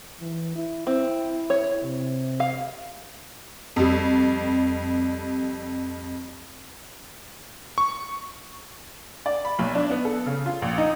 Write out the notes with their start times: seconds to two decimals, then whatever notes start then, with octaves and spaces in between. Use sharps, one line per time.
0.21 E3
0.55 E4
0.87 C4 E4
1.50 C#5
1.83 C3
2.40 F5
3.76 F2 G3
7.78 C#6
9.26 D5
9.45 B5
9.59 B1
9.75 D4
9.90 B3
10.05 A4
10.26 C#3
10.46 F4
10.62 A#1
10.78 D#4